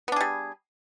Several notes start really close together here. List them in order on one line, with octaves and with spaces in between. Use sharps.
B3 D4 G#4 G3